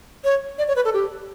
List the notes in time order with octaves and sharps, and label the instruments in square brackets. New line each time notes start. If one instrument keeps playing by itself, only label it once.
[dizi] C#5
D5
C#5
B4
A4
G4